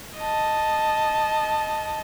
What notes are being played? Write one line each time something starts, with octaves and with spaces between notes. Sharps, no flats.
D#5 A5